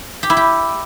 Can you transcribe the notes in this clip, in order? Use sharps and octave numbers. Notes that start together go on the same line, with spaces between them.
G4
E4
G4